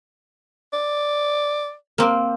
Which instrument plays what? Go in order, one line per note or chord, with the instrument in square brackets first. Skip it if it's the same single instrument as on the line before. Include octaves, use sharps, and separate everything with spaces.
[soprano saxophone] D5
[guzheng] A#3 C4